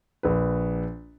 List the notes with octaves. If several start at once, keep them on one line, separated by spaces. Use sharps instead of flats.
A#1 B4